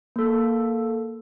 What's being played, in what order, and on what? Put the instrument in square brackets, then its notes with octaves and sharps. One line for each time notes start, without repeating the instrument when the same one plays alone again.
[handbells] A#3 A4